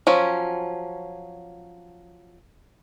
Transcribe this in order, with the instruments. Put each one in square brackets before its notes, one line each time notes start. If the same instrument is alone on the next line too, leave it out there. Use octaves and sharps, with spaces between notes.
[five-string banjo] F3 F#3 C#4